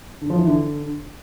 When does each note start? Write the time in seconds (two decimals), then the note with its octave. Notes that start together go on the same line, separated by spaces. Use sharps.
0.21 D3
0.30 F3
0.38 E3
0.47 D3